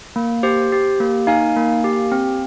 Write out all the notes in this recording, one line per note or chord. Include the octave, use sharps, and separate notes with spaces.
A#3
G4 C5
G4
A#3
D#4 F5 G#5
A#3
G4
C4